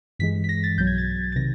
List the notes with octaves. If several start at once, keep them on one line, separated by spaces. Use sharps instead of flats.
G2 E3 G#3 B6
B6
A#6
A6
B1 B2 F#3 G6
G#6
A6
A6
C3 D#3 A#6